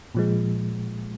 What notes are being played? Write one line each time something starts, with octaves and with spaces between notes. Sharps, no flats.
A#2 F3 G#3